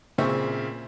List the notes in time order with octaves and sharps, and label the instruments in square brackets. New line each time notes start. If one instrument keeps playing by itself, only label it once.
[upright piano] A#2 C#3 C4 E5 C#6